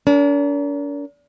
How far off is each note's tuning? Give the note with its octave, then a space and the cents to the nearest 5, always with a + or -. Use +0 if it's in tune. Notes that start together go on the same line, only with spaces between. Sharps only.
D4 -45 A#4 +0